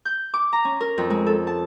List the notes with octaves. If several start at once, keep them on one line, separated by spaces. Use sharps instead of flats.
G6
D6
A#5
C#4
A#4
F2
G#3
A4
A5